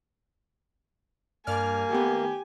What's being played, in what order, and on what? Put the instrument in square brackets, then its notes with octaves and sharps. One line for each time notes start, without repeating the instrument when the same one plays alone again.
[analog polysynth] G2 D5 F6 [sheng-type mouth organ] A#3 [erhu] G#5
[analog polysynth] D#3 A3 B3 [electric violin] G4